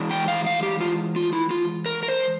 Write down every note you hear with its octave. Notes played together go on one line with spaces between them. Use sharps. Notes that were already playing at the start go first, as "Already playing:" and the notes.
Already playing: E3 G#3 E4
G5
F5
F5
G4
F4
F4
E4
F4
A#4
A#4
C5